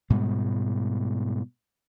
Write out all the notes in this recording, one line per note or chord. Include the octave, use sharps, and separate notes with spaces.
G#2 B2 G3 G#3